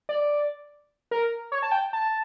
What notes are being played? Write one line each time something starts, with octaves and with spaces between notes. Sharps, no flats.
D5
A#4
C#5
A5
G5
A5